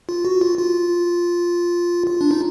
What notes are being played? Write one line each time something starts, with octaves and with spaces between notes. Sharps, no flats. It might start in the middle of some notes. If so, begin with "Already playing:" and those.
F4
F#4
F4
F4
F4
D4
D#4